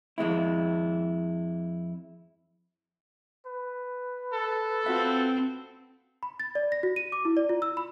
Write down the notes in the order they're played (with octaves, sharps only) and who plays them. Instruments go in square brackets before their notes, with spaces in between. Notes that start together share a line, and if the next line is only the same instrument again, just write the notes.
[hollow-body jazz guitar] F2 G#3 C4 E4
[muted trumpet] B4
[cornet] A4
[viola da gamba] C4 [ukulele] F4 F#4 E5
[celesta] B5
A6
D5
A#6
F#4
D#7
D6
E4
D5
F4
E6
B5